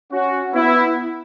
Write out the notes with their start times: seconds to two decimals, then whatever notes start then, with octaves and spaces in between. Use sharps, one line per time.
0.12 C#4 F#4
0.54 B3 E4